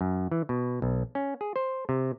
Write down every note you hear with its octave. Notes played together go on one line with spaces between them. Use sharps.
F#2
E3
B2
B1
C#4
G#4
C5
C3